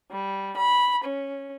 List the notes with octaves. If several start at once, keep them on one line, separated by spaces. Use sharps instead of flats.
G3
B5
C#4